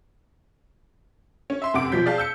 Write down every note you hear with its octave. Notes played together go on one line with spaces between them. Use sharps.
C#4
E5 C6
F1 F#2 C3 F#5 D6 D7
B2 F3 F#3 G6 B6
G#4 D5 F5 A5 G6
E6 G6 C#7